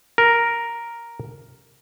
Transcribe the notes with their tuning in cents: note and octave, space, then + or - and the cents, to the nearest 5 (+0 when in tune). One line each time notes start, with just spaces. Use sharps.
A#4 +0